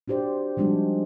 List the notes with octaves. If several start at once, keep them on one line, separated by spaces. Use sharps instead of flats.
D4 F#4 G4 C5 D5
F3 G3 G#3 D4 D#4 F#4